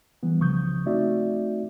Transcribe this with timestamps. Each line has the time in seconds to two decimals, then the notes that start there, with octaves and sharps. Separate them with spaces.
0.23 E3 G3 B3
0.40 C2 C#3 F3 C#6 D#6 G6
0.86 A3 C4 D#4 F#4 D5 E5